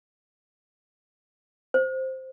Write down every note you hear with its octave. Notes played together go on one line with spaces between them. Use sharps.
C5